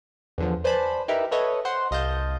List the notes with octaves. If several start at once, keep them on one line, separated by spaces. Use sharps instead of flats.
E2 D3 F3
B4 C5 D5 G#5 A5 B5
D#4 E4 G4 A#4 B4 E5
A4 B4 C#5 D#5 E5
C5 F#5 C6
C2 D#5 F5 A5 G6